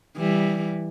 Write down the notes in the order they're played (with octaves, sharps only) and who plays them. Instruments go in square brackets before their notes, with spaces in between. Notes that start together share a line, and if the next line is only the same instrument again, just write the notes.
[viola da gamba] E3 G3